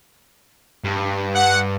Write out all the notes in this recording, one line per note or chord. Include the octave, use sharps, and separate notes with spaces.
G2
F#5